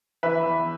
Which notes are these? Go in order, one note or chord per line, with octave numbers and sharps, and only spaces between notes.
E3 B4 E5
E2